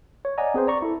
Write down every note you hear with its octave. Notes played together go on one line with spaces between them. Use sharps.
C#5
D5 D#5 F#5 G#5 A#5
C4 G#4 B4 C5
D5 A#5 C#6
E4 A4